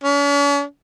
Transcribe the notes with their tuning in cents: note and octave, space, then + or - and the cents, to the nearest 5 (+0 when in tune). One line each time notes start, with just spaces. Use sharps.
C#4 +45